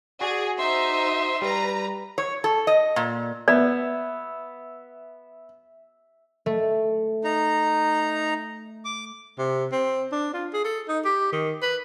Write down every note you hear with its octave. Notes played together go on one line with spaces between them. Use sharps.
F#4 G#4 D5
D#4 C5 E5 C6
G3 B4 A#5
C#5
A4
D#5
A#2
B3 D5 E5
A3
D#4 A#5
D6
C3
C4
D4
F4
G#4
A4
D#4
G4
D#3
B4